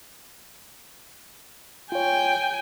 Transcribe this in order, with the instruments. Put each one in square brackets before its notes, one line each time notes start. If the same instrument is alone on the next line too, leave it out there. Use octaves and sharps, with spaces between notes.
[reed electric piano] F4 C#5 [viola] G5 G#5